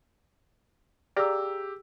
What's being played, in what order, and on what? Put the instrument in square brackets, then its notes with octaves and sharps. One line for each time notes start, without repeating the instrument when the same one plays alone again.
[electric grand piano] G4 [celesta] G#4 E6 [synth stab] D5 F5 A#5